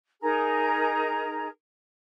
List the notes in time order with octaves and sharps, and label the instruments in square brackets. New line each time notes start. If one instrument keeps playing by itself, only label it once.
[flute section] D#4 G#4 A#4 A#5